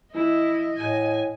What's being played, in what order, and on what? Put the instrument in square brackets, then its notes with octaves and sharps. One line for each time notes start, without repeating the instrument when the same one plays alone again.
[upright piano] E3 [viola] E4 [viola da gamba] D#5
[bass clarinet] A2 [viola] G#5